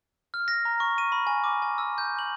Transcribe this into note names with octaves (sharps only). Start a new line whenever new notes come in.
F6
A#6
A#5
C#6
D#7
B5
G#5
D6
G#5
E6
G6
F#7